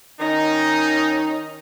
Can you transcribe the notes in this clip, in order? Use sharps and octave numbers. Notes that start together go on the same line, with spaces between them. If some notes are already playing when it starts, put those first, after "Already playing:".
D#3 C#4 D#4